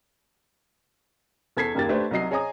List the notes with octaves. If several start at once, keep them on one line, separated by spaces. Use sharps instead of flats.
E2 A4 G#6 B6 C7
F#1 D#2 A#3 G4 A6
A3 D4 G4 B4 C5
C2 F#3 D#5 C7
G#4 C#5 D#5 G#5 A#5 D#6